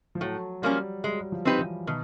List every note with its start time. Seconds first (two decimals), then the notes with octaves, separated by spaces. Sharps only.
0.15 F3
0.21 A2 F#3
0.62 F3 G3 A#3 C#4
1.04 G3 G#3
1.12 F#3
1.21 G3
1.32 F3
1.45 C4 D#4 G4 B4
1.59 E3
1.87 B2 D#3